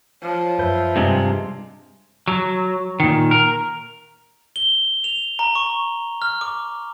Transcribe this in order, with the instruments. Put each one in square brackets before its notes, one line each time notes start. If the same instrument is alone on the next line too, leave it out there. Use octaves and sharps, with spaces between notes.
[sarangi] F3 [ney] C#5
[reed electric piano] F#2 B4 G6 [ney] E5
[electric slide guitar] G2 C3 G#3
F#3
A#2 D#3
A#4
[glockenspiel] G7
F7
A#5
C#6
F6
D6